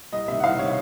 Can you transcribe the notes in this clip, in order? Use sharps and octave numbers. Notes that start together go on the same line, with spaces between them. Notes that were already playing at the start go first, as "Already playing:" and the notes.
C2 D#5
C3 D#3 E5
F#5
C2 F5
C3 D#3 C#5